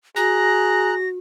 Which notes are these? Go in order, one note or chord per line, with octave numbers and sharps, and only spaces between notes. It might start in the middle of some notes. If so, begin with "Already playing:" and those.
F#4 G#4 A#5 F#6 A#6